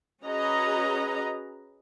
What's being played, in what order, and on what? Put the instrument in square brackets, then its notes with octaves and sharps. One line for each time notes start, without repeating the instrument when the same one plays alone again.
[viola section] C#4 F#4 G#4 B4 D#5 A#5